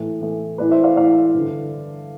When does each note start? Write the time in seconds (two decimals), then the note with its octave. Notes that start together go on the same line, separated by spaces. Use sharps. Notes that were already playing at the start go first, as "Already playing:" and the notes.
Already playing: A2 E3
0.21 A2 E3
0.58 A2 E3 B4 D5
0.71 C5 E5
0.84 D5 F5
0.96 A2 E3 D5 F5
1.34 G2 D3